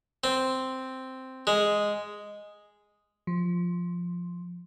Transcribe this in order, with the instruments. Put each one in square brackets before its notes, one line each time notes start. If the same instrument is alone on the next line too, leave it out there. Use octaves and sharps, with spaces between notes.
[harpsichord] C4
G#3
[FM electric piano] F3